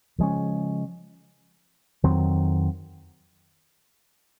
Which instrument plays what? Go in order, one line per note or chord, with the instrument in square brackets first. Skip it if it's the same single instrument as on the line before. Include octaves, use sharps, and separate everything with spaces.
[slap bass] C#3 F3 G#3 C#4
F2 D#3 F#3 C4